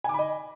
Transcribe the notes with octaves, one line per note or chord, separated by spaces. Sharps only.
D#5 G#5 B5 D6